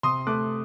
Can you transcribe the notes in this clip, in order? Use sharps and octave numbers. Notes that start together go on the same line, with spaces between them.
C3 C6 D#6
A3 D6 F#6